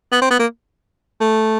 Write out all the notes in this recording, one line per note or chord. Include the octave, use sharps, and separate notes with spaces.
B3
C4
B3
A#3
A3